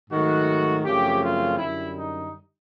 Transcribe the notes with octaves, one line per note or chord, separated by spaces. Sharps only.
G#2 D#3 F#3 A3 F#4
F#2 C#3 F3 A3 C4 G4
F4
F#2 D3 G3 E4
D#4